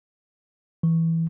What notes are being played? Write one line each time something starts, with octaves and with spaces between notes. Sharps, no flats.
E3